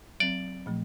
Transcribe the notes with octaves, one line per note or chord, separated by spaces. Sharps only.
F#3 C4 D5
A#2 F3 A3